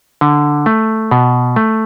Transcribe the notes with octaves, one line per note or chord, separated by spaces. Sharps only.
D3
A3
B2
A3